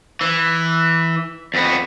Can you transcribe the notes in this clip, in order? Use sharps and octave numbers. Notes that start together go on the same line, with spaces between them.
E3
F2 B3